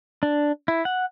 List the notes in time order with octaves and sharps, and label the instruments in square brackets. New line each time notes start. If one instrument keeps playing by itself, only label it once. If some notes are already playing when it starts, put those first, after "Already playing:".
[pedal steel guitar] D4
E4
F#5